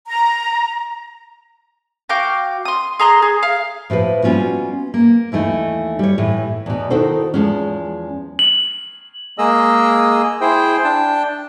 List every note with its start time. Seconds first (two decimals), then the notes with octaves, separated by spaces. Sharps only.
0.07 A#5
2.09 F#4 F5 G5 D6
2.65 C6 D#6
2.99 G#4 A#5 C6 F#6
3.22 G#4
3.43 F5
3.90 A2 F3 G4 B4
4.23 G3 B3 C#4 F4 F#4
4.94 A#3
5.32 D#2 E3 A3 D#4
5.99 G3 C#5
6.18 A2 E3
6.66 E2 B2
6.90 D#3 D#4 E4 F#4 A4 C5
7.34 E2 F3 G#3 C#4
8.39 F#7
9.38 G#3 A#3 G#4 D#5 E6
10.41 E4 G#4 C5 G5
10.84 D4 G5 A5